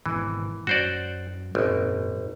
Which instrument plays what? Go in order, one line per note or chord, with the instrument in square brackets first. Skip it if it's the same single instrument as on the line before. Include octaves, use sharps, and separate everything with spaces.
[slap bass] G#1 B2 [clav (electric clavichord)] E3
[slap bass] F#2 [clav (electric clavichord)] F#4 C5 D5
[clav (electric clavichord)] G#1 [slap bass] F#2 A#2